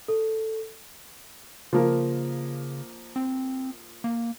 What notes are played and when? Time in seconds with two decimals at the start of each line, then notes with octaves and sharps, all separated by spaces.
0.08 A4
1.73 C#3 F3 A#3
3.16 C4
4.04 A#3